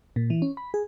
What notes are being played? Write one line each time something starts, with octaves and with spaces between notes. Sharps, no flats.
A#2
E3
C#4
B5
G#4